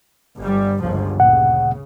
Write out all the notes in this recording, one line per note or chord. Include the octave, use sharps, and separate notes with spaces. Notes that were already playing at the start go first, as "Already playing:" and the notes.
G1 G3
G1 C#2 F3
D2 A#2 C#3 F#5